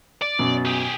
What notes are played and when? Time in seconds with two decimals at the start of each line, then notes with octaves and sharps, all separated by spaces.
0.22 D5
0.39 F#2 B2
0.65 G4 G#4